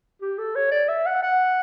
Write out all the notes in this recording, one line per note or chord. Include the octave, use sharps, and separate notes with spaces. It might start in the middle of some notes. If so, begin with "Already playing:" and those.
G4
A4
C#5
D5
E5
F#5
F#5